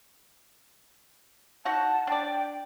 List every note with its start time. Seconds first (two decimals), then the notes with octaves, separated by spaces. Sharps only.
1.65 D#4 F#4 F#5 A5
2.07 D4 D5 G5